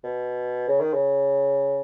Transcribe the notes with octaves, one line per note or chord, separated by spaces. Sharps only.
B2
C#3
D#3
C#3